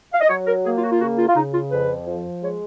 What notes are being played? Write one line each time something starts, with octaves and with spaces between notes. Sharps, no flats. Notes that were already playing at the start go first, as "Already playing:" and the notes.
F5
D#5
F#3 C#5
A#4
A#3 G#4
F4
F#4
F4
C#3 F#4
F4
F4
C#3 D#4
F4
F2 B4
F3
G#3 C#5